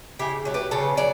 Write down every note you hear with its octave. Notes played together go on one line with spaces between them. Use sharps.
C#3 E4 G4
F#3 A3
G4 B4
C#3 A4 C#5
F#3 D5